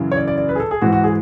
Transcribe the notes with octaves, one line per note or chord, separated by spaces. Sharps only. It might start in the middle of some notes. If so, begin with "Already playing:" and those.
Already playing: F#2 C#3 E3
C#5
D5
D5
D5
B4
G#4
A4
G#4
G#2 E3 F#4
F#4
G#4